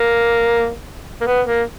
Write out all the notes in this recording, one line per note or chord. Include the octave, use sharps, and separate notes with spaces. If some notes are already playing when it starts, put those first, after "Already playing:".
Already playing: A#3
A#3
B3
A#3